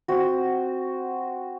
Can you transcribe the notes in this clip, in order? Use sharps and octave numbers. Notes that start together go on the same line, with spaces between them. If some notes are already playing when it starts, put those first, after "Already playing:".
C4 F#4